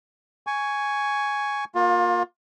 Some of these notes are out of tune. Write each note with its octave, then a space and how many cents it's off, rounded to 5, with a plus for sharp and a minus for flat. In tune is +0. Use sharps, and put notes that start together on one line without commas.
G#5 +0 C#6 +10
A#3 +0 F4 +30